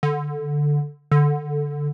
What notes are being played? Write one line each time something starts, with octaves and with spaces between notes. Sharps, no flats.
D3
D3